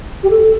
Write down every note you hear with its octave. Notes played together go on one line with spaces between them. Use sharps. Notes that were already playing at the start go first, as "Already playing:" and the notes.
G4
A4